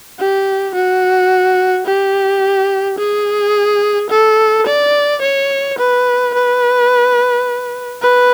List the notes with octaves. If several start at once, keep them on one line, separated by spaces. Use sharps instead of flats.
G4
F#4
G4
G#4
A4
D5
C#5
B4
B4
B4